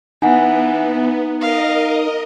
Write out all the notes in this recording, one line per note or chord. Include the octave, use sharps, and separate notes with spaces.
E3 B3 D#4 F#5 G#5
A#4 D#5 F5